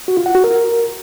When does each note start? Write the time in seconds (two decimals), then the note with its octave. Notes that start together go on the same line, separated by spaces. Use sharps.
0.08 F#4
0.17 F4
0.26 F#5
0.35 F#4
0.44 A#4